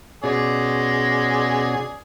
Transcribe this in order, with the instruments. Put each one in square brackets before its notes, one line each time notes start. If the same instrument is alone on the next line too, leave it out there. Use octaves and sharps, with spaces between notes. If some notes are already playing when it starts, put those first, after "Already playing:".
[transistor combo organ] B2 C#4 F#4 [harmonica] G#3 G#4 D5